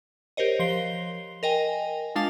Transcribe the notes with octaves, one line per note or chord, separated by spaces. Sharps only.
G4 A#4 C5 C#5 D#5
F3 C7 G7
A#4 D#5 G5 G#5
G#3 D4 F4 F5 A5 F7